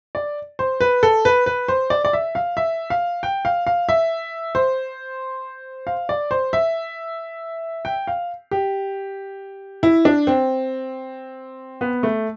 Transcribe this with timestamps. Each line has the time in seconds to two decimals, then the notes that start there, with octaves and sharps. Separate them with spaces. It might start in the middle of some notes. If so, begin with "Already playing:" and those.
0.15 D5
0.59 C5
0.81 B4
1.03 A4
1.25 B4
1.46 B4
1.68 C5
1.90 D5
2.05 D5
2.13 E5
2.35 F5
2.57 E5
2.90 F5
3.23 G5
3.45 F5
3.67 F5
3.89 E5
4.55 C5
5.87 F5
6.09 D5
6.31 C5
6.53 E5
7.85 G5
8.07 F5
8.51 G4
9.83 E4
10.05 D4
10.27 C4
11.81 B3
12.03 A3